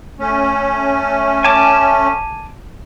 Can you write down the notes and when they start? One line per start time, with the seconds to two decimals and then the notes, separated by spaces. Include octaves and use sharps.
0.19 A3 C#4
1.44 G#5 A5 D6